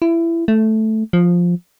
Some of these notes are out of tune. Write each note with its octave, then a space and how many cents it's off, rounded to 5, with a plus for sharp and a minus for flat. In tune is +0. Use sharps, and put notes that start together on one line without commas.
E4 +20
A3 -5
F3 +5